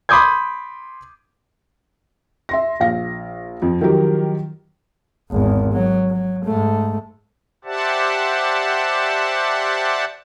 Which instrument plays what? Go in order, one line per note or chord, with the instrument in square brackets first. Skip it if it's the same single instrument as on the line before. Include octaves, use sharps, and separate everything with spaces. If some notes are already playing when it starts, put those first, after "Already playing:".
[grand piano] B5 C6 D6 D#6 G6 G#6
[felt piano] E5 C6 A#6
A#1 F5 A#6
F2 F3
D#3 F3 F#3 G4 A#4
[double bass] G#1 E2
F#3
F#3
G#2 A3
[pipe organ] G4 C5 D5 E5 F#5 A5